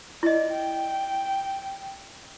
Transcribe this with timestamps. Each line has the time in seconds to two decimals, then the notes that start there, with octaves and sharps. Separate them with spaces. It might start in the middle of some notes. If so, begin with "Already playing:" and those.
0.23 E4 D5 D#5
0.52 G5